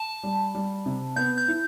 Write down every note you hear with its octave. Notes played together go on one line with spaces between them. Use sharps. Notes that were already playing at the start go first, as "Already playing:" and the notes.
Already playing: A5
G3
G3
C3
B3 G6
G6
E4